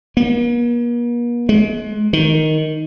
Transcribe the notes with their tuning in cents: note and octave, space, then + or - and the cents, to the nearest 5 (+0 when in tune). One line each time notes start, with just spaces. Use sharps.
A#3 +45
G#3 +35
D#3 +5